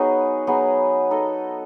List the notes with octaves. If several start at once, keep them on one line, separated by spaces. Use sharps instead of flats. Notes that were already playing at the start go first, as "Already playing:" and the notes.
Already playing: F#3 B3 D#4 F#4 G#4 C#5
F#3 B3 D#4 G#4
D#4 A4 D#5